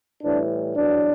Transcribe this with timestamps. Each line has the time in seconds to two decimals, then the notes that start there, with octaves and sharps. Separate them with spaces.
0.24 A2 E3 G3 D4
0.75 E2 B2 F#3 D4